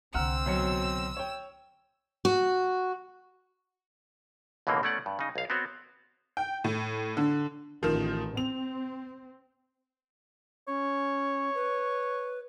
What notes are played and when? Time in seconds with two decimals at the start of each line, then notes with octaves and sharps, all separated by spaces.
0.14 C2 D3 C4 F#5 A#5 E6 F6
0.46 B1 F#3 C#7
1.17 C#5 G5
2.25 F#4
4.67 C#2 B2 D3 E3 A#3 C4
4.83 A3 B3 C#4 D5 F#5
5.06 G2
5.19 C#3 D#4
5.36 B1 F5
5.50 B3 C4 F#4 C#5
6.37 G5
6.64 A2
7.17 D3
7.83 A1 D#3 F3
8.37 C4 F7
10.68 C#4 C#5
11.55 B4